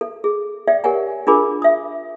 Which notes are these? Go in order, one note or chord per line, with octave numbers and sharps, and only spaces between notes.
A4
G#4
A4 D5 E5 G5
G4 A#4 C#5 F#5 G#5
D4 F4 G#4 A#4 B5 D6
E5 D#6